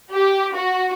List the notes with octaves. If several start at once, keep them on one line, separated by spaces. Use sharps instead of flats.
G4
F#4